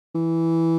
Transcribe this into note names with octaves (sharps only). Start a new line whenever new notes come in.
E3